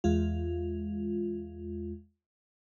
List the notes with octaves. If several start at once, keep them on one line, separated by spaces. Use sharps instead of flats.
E2 G#3 F4